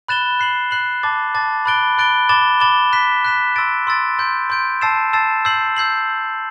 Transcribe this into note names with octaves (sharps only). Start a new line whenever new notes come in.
B5 F#6 A6 E7 G7
F#6 C7 F#7
F#6 C7 F#7
A5 D6 A6
A5 D6 A6
B5 F#6 A6 D7 G7
B5 F#6 A6 D7 G7
B5 D6 A6 E7 G7
B5 D6 A6 E7 G7
F#6 B6 E7
F#6 B6 E7
C6 E6 A6 D7
C6 E6 A6 D7
C6 G6 D7
C6 G6 D7
A5 E6 A6 C7 E7
A5 E6 A6 C7 E7
E6 G6 C7 F#7
E6 G6 C7 F#7